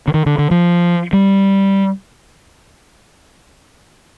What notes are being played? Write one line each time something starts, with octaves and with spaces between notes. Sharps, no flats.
D3
D#3
D3
D3
F3
G3